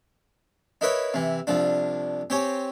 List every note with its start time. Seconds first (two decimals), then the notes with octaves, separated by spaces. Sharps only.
0.81 D#4 E4 A#4 B4 C#5
1.14 C3 E3
1.47 C2 F3 D4
2.30 C4 G4 C#5 G#5